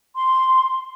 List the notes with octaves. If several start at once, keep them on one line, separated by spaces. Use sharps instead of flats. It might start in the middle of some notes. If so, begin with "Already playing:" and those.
C6